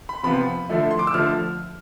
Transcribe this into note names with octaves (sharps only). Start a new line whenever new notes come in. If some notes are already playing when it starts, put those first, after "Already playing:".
B5
C3 F3 B3 F4 B5
D3 F3 A3 E4
C6
D6
E6
D3 F3 A3 F6